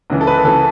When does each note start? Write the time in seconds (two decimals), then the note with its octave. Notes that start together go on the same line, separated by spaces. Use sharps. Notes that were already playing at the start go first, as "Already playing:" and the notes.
0.10 C#2 C#3 E3
0.21 A4
0.27 B4
0.45 C#3 E3 A4